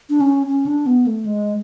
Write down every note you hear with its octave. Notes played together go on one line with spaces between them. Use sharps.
D4
C#4
C#4
D4
B3
A3
G#3